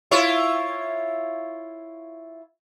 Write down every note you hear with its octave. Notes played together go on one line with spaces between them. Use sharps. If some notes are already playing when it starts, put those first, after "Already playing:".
E4 F4 C#5